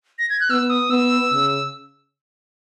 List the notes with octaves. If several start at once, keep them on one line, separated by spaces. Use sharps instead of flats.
A#6
G#6
F#6
B3 E6
D#6
B3 E6
C#3